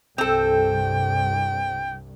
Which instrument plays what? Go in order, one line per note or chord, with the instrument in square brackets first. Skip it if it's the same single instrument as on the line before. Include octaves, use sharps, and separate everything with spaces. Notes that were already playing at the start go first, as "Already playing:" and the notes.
[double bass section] C2 G2 [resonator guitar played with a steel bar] C4 A4 [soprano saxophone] G5